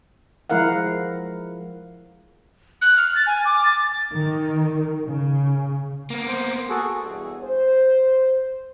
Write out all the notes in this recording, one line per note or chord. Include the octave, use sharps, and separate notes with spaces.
F3 G#3 E4 A#4 F5 F#5
F#6
F6
A6
G#5
D6
A6
D#3
C#3
A#3 B3
C5
F#4 G#4 A4
E2 G2 B2 F#4 G#4
C5